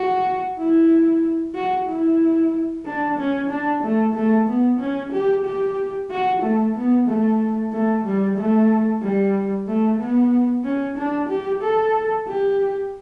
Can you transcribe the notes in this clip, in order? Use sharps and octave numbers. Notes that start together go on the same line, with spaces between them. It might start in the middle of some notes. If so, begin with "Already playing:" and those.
Already playing: F#4
E4
F#4
E4
D4
C#4
D4
A3
A3
B3
C#4
G4
G4
F#4
A3
B3
A3
A3
G3
A3
G3
A3
B3
C#4
D4
G4
A4
G4